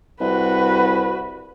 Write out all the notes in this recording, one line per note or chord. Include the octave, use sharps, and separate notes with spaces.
C2 F#4 B4